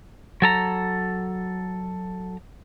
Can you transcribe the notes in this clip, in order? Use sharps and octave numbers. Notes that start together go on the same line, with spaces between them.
F#3 A4 A#5